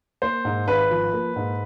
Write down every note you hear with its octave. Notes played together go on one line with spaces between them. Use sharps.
A#3 C5
G#2
G#1 B4
F3
A#3
G#2